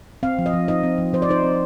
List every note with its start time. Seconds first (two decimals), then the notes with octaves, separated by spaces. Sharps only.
0.23 C4 F5
0.39 F3
0.46 D#5
0.53 F3
0.68 D#4 D#5
0.83 C4
0.98 F3
1.13 F3 C5
1.22 D5
1.29 D#4 C5
1.43 C4